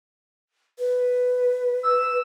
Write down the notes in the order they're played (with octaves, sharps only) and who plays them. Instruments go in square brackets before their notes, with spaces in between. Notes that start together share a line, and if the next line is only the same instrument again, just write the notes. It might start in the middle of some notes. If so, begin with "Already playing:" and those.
[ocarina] B4
[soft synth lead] E6